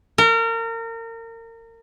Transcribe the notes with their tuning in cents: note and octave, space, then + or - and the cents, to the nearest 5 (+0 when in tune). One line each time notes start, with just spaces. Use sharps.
A#4 -30